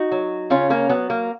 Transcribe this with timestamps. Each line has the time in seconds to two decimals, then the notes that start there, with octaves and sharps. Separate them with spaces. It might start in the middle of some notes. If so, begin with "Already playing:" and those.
Already playing: D#4 F#4
0.11 F#3
0.50 C#3 C#4 F4
0.70 A#3 C#4
0.89 F#3 B3
1.10 A#3